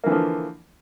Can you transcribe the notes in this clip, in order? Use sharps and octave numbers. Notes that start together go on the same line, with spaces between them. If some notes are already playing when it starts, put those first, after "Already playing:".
D3 E3 F3 A#3